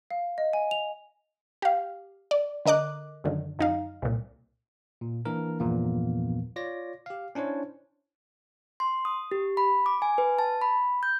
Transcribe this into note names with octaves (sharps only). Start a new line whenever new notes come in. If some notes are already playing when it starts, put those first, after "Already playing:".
F5
D#5
G#5
F7
G4 F5
D5
D3 A#4 D#5 D6 F#6
F#2 D3 D#3
F#2 D#4 F5
C2 A#2
A#2
E3 A#3 D4 A#4
E2 G2 A#2 F3 A#3 B3
F4 C#5 D5 A#6
G4 F5
C#4 D4 E4 C5 C#5
C6
D#6
G4
B5
D6
G#5
B4
A5
B5
G6